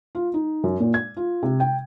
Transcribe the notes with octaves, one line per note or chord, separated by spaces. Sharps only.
F4
D#4
F#2
A#2
G#6
F4
C3
G5